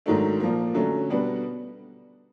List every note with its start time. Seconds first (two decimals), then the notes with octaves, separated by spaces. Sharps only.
0.06 G#2 D#3 F#3 A3 D4
0.40 A#2 F3 A#3
0.74 D3 F#3 A3 C#4
1.09 B2 G3 B3 D4 F#4